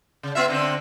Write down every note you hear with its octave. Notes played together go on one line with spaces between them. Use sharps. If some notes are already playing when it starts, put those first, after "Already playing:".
C#3
B3 F4 E5
D3 C4